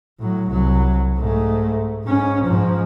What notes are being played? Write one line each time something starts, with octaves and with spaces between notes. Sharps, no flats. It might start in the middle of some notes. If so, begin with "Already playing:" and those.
A2 F#3
C2 F#3
G#2 A3
G#2 C#4
G#2 F3